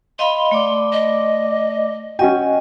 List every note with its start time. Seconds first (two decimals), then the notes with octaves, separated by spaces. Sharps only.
0.19 D#5 F5 B5 C6
0.51 A3 D5 D6
0.92 D#5
2.19 C#4 F#4 D#5 G5 G#5